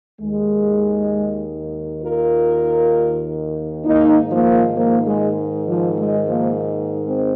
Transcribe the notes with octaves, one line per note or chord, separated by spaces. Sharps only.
D#2 D#3 G#3
F4 A#4
G#2 D#3 A#3 D#4
F3 A#3
F3 A#3
G#3
F3
G#3
F3 A#3
G#3 C4